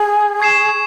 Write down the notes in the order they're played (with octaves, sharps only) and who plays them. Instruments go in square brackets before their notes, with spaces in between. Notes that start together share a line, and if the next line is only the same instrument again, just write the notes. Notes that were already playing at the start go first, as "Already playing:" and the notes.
Already playing: [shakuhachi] G#4
[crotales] C#6 G#6 C7 E7